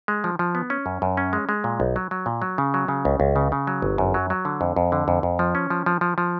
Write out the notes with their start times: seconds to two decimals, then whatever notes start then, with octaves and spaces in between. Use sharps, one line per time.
0.08 G#3
0.24 F3
0.39 F3
0.55 B3
0.70 C#4
0.86 F#2
1.02 F#2
1.17 C#4
1.33 G#3
1.49 G#3
1.64 A#2
1.80 B1
1.96 F#3
2.11 F#3
2.26 A#2
2.42 F#3
2.58 C#3
2.74 F#3
2.88 C#3
3.05 C#2
3.20 C#2
3.36 C#3
3.52 C#3
3.67 F#3
3.82 G1
3.98 F#2
4.14 F#3
4.30 F#3
4.45 D3
4.61 F2
4.76 F2
4.92 D3
5.08 F2
5.23 F2
5.39 F3
5.55 C#4
5.70 F3
5.86 F3
6.01 F3
6.18 F3